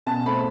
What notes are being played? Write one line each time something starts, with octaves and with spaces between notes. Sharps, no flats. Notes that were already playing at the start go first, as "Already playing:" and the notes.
B2 A5
A3 C4 B5